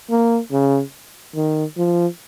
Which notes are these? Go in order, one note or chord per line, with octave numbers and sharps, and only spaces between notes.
A#3
C#3
D#3
F3